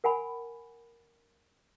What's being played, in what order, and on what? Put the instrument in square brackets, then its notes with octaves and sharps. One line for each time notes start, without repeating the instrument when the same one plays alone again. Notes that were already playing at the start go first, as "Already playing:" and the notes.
[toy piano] A#4 F#5 G#5 B5